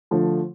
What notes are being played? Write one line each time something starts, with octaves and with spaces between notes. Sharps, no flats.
D3 F3 A3